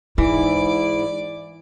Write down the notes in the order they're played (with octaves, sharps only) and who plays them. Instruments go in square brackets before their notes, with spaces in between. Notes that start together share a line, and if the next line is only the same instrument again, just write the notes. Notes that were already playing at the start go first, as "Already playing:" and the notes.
[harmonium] G#2 E4 [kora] E3 [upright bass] D#4 [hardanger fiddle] D5 D6